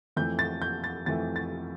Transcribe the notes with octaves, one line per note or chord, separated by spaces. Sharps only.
F2 E3 A3 G6
A6
G6
A6
F2 E3 A3 A6
A6